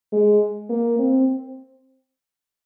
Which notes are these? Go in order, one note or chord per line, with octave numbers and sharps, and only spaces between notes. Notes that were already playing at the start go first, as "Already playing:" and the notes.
G#3
A#3
C4